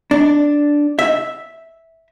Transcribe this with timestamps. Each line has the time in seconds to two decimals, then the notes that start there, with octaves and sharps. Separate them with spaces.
0.11 D4
0.99 E5